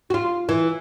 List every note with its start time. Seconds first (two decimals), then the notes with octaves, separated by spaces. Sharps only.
0.10 F4 F#4
0.49 E3